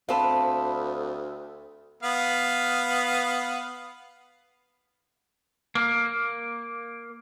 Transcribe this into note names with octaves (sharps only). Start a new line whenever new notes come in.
D2 C4 B4 F5 A5
B3 F5
A#3